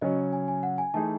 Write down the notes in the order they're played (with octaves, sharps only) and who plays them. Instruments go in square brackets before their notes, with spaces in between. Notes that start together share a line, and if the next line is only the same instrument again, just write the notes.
[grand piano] C#3 F#3 C#4 [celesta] D#5
[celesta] G#5
G#5
F#5
G#5
[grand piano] E3 A3 D#4 G#4 [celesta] A5